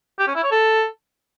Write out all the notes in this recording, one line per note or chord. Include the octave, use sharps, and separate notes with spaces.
G4
C#4
E4
C#5
A4